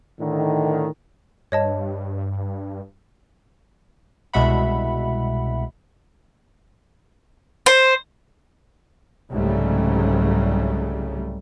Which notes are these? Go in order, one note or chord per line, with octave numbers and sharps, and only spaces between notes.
A2 D3 D#3
G2 C#5 D#5 A5
C2 B2 G#3 E5 F#5 B5
C5
C2 G#2 C#3 F#3 G3 A3